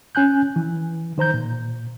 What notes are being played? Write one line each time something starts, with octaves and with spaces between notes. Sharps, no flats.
C#4 G#5 F#6 G6
E3
D#3 C5 A#5 G6
A#2